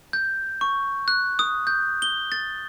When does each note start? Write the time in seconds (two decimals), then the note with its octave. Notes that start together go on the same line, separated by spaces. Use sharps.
0.13 G6
0.61 C#6
1.08 F#6
1.39 D#6
1.67 G6
2.02 G7
2.32 A6